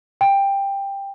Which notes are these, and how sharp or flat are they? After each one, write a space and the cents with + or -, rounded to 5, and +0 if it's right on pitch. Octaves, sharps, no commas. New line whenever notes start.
G5 +15